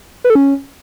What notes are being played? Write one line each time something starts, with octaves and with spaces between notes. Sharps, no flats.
B4
A4
C#4